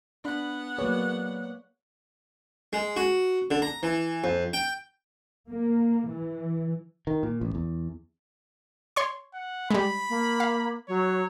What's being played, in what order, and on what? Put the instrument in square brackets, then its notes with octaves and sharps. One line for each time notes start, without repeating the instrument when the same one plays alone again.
[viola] B3 F#5 [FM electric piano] D4 [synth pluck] B5 F#6
[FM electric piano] F#3 G#3 G#4 [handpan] A#3 B4 [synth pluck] C#5 D5
[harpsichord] G#3
F#4
D3
A#5
E3
F2
G5
[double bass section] A#3
E3
[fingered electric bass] D#3
A#2
A1
E2
[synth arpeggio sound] C#5 C6 C#6
[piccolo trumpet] F#5
[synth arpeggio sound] G3 G#3 [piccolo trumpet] B5
[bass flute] A#3
[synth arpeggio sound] F5
[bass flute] F#3 [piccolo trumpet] C#5